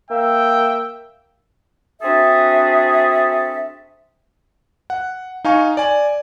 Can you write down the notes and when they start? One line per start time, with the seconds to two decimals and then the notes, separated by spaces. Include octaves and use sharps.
0.10 A#3 E5 G5
2.02 C4 D4 F#4 G#4 A4 E5
4.90 F#5
5.45 D#4 F5 G#5 C#6
5.77 D5 G#5